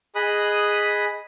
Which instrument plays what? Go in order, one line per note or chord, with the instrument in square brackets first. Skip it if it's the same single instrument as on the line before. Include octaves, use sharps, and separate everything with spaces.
[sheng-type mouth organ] G#4 D#5 B5 D#6 F#6